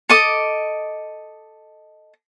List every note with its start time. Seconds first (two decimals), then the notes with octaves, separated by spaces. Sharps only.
0.09 A4 D#5 D6